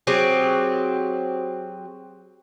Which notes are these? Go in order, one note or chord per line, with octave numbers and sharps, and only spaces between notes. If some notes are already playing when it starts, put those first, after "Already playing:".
F#3 C4 G4 G#4